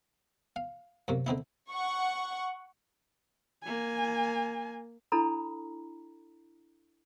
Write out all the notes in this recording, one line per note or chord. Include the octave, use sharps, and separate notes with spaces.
F5
F#2 C3 A#3
D3 C4 D#4 E4
F#5 C#6
A#3 G#5
D4 E4 A4 A#5 B5